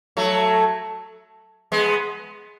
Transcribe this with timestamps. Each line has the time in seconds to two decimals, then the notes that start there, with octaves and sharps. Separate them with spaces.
0.17 F#3 A3
1.72 G#3 B3